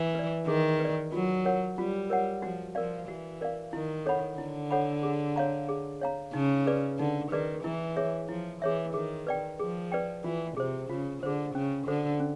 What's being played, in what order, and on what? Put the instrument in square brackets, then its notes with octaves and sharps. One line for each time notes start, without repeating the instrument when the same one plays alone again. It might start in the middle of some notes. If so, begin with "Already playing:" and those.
Already playing: [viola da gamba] E3
[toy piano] B4 D5
[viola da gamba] D#3 [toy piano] G#4
[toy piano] B4 D5
[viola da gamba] F#3 [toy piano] F4
[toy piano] A#4 C#5 F#5
[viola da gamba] G3 [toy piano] F4
[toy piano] A#4 C#5 F#5
[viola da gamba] F3 [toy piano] F#4
[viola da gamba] F3 [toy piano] A#4 D5 F5
[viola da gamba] E3 [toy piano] F#4
[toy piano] A#4 D5 F5
[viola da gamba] D#3 [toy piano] E4
[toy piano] A4 C#5 F#5 B5
[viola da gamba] D3 [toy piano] E4
[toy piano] A4 C#5 F#5 B5
G#4
C#5 F5 A#5
G#4
C#5 F5 A#5
[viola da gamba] C#3 [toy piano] D#4
[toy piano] G#4 B4 D5
[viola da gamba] D3 [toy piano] D#4
[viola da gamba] D#3 [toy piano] G#4 B4 D5
[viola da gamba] E3 [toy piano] E4
[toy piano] G#4 C#5 E5
[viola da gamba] F3 [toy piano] E4
[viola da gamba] E3 [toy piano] G#4 C#5 E5
[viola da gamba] D#3 [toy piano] G#4
[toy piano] B4 D5 G5
[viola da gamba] F3 [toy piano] G#4
[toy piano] B4 D5 G5
[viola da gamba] E3 [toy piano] F4
[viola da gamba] C3 [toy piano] G#4 C5
[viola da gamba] C#3 [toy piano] F4
[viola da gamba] D3 [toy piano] G#4 C5
[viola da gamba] C#3 [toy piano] C#4
[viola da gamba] D3 [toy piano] F#4 A4 C5
[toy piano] C#4